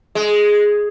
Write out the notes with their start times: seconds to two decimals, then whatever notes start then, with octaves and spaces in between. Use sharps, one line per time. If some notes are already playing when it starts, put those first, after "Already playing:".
0.15 G#3